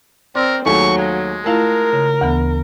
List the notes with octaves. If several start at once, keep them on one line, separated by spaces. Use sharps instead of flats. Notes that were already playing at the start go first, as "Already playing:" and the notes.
C4 A#4 D5 C6 E6
D#2 F#3 A3 G#4 C#6
G#3 F5
A3 E4 F4 A#4 F5 A5
C#3
D2 E3 B3